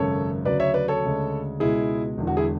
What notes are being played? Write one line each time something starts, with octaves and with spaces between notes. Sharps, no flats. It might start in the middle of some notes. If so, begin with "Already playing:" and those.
Already playing: G#1 F#2 C#3 A4 C#5
D2 C#3 F#3 B4 D5
C#5 E5
B4 D5
A4 C#5
D2 C#3 G#3
C#2 B2 G#3 E4 G#4
E1 E2 D3
F#4
E4 G#4